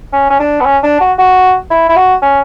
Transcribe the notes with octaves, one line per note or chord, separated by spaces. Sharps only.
C#4
C#4
D4
B3
C#4
D4
F#4
F#4
E4
E4
F#4
C#4